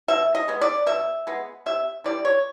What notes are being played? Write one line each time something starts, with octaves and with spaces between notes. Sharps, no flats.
B2 E5
D#5
G#3 B3
D5
B2 E5
G#3 B3
C3 E5
E3 G3 D5
C#5